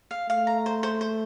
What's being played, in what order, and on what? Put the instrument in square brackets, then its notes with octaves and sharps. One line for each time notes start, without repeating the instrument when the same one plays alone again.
[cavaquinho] F5
[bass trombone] A3 [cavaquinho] F5
[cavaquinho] A#5
C5
C5
C5